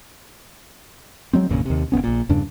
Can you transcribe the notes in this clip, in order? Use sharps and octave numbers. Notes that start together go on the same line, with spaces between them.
F#3 G#3 C4
G#1 E2 A#2 C#3
D#2 C3
F#1 A2 B3 C#4
A#1 A#2
E2 G2 C#3 D4